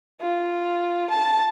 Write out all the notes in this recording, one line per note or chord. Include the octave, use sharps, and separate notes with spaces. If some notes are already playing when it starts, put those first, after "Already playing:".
F4
A5